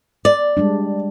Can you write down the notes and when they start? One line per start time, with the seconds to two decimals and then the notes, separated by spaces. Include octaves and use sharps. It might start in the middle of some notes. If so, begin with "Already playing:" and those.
0.25 D5
0.57 G3 G#3 D4